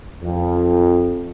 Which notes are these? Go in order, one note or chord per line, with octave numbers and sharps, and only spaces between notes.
F2